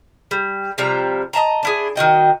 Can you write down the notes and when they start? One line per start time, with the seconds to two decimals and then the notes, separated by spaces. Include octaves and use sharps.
0.31 G3
0.78 C3 F3 G3 A#5
1.33 D#5 E5 A5 A#5
1.63 D4 E4 G#4
1.96 D#3 F#4 D#5 G5